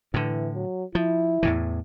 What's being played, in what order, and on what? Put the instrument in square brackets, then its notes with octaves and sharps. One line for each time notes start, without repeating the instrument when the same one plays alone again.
[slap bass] A2 D3 [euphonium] E3
[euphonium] F#3
[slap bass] F3 [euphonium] E4
[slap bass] E2 A2 E3